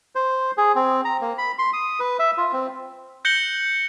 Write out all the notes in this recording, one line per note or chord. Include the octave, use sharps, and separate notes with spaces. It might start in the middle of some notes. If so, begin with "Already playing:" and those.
C5
G#4
C4
A#5
A#3
B5
C6
D#6
B4
E5
F4
C4
F#6 G6 A#6 C#7 F#7 G7